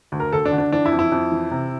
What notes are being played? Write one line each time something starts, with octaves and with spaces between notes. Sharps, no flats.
D2
A#4
D2 A4
D4
D3
D4
E3 D4
E4
F2
E4
F2
E3
C3